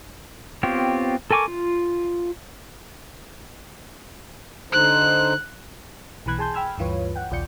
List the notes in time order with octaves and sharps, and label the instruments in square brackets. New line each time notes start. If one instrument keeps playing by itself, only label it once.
[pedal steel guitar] B3 C4 F4 G4 C#5
A4 A#4 G#5 C#6 D6
F4
[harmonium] D3 D#4 C5 [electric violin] F#6
[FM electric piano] B1 B2 E3 B5 F#6 G#6
G#4 G#5 A5 C6 G6 G#6
G5 B5 E6 F6 G#6
D2 G2 E3 F4 B4 C#5
F#5 G5
A#1 D#2 F4 D5 G6 C#7